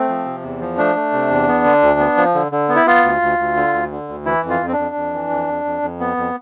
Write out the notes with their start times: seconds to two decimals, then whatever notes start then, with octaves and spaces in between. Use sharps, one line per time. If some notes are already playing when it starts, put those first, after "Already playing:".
Already playing: A3 C4
0.09 F3
0.26 C3
0.43 E2
0.61 F3
0.78 A3 D4
0.95 A3
1.13 C3
1.30 E2
1.48 B3
1.65 D3
1.82 D2
1.99 B3
2.17 F3
2.34 D3
2.52 D3
2.69 B3
2.75 E4
2.86 B3 F4
3.04 D2
3.22 D2
3.39 D2
3.56 D3
3.73 D2
3.91 D3
4.09 D2
4.26 E3 E4
4.43 F2
4.50 F4
4.61 F2
4.67 C4
4.73 D4
4.78 F2
4.95 F2
5.13 E3
5.30 F2
5.48 F2
5.65 F2
5.82 F2
6.00 B3
6.17 F2